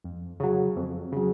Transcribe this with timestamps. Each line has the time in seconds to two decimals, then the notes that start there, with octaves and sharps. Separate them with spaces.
0.04 F2
0.40 C#3 F#3
0.76 F2
1.12 C#3 F#3